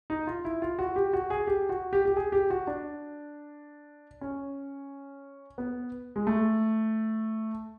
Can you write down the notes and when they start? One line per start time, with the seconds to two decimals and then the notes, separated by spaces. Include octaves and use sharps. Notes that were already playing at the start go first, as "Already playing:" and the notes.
0.10 D#4
0.27 F4
0.45 E4
0.62 F4
0.79 F#4
0.96 G4
1.13 F#4
1.30 G#4
1.47 G4
1.69 F#4
1.93 G4
2.05 G4
2.16 G#4
2.32 G4
2.50 F#4
2.67 D4
4.21 C#4
5.58 B3
6.16 G#3
6.27 A3